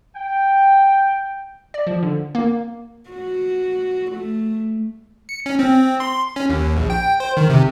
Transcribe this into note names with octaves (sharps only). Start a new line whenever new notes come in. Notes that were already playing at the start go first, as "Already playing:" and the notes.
G5
D5
F3
D3
A#3
F#4
A3
C#7
C#4
C4
C6
C#4
D#2
A#1
G5
C5
D#3
C3